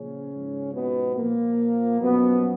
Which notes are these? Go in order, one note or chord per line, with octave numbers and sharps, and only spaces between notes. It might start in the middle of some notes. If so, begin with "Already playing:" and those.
Already playing: A#2 C#3 F3 C#4
G#2 F3
B2 B3
A#2 F3 A#3
F#2 B2 F3 B3